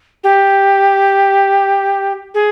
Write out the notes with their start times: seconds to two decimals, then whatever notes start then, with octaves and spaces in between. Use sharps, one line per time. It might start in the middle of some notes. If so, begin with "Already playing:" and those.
0.24 G4
2.34 G#4